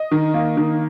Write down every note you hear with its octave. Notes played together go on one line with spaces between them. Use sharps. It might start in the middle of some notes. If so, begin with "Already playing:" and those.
Already playing: D#5
D#3
A#3
D#3